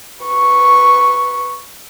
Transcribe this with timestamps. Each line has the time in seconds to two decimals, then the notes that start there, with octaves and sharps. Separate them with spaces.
0.24 B4 C#6